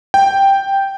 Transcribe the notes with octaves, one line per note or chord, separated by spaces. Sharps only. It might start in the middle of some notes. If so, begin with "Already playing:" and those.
G5